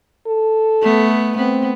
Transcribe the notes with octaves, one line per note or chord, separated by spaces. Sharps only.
A4
A3 B3
B3 C4